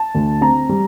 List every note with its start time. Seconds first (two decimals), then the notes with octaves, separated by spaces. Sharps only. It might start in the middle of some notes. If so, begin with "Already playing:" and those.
Already playing: A5
0.15 D2
0.41 C4 A#5
0.69 G3